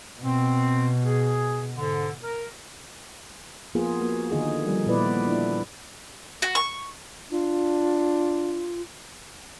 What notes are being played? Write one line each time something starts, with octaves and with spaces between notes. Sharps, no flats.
B2 C4
G#4
G#2 D3
A#4
F3 A#3 B3 F4 G#4 A#4
A#3 F#4
D3 D#3 D#4 G#4
F3 G3
A#2 B3 E4 B4 D5
D4 E4
F#4
C#6
D4 F4